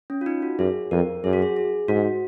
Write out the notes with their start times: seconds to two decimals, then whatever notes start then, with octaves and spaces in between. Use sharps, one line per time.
0.10 C#4
0.21 F4
0.26 D#4
0.42 F#4
0.59 F#2 G#4
0.91 F2 A#4
1.24 F#2 G#4
1.33 F#4
1.42 G#4
1.56 G#4
1.88 G#2 F#4